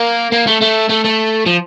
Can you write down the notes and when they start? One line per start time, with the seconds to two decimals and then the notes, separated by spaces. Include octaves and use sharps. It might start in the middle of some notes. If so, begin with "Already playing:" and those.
Already playing: A#3
0.32 A#3
0.47 A3
0.61 A3
0.89 A3
1.04 A3
1.46 F3